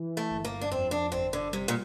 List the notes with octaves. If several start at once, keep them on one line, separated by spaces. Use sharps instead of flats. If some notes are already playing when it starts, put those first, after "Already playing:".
Already playing: E3
A3
G1
A#3
D4
F2 C4
D4
G1 C4
D3
C3 G3
A#2